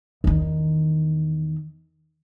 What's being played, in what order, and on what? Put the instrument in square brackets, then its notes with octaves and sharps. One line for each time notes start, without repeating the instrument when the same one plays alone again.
[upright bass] E2 D#3